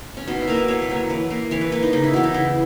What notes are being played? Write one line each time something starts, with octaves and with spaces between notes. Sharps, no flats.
C#4
B2 D#4
E4
F#3 A#3 A#4
B4
B2 C#5
B4
F#3 A#3
C#5
E3 B4
A#3
E3 C#5
B4
A#3 B4
D#4
C#3 D#4
E4
E3 B3 F#4
D#4
C#3 E4